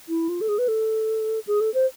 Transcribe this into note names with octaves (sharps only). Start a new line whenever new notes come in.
E4
F4
A4
G#4
B4
A4
G#4
A4
C5